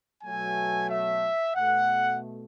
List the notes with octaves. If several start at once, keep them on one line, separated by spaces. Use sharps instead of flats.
B2 F#3 A3 G#5
E5
B2 A3 F#5